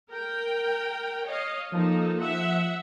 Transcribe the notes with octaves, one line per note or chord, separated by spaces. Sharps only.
A#4 G5
C#5 D#5 F5
F3 A#3 D#4 A4
E5 F#5